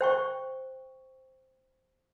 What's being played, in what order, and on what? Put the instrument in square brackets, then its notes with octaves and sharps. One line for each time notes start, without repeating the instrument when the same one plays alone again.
[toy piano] C5 G5 C#6